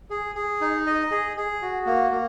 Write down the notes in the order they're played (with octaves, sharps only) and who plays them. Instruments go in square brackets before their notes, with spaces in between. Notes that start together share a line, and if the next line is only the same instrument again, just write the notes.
[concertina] G#4
G#4
D#4
D#5
G#4
G#4
F#4
A#3
A#3